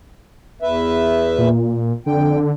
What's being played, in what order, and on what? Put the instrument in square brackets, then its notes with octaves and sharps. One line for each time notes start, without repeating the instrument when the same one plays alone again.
[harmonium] E2 B4 E5
[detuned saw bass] A#2
[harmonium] F2 G5 [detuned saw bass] D3